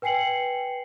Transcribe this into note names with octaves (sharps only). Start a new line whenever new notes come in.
B4 G5 G#5 C7 C#7 F#7